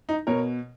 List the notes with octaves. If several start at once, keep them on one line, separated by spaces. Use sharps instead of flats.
D#4
B2 A#4 C#5